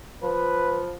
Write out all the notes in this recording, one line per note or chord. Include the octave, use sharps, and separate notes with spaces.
F3 B4